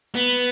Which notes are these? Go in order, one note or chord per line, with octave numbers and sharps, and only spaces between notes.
B3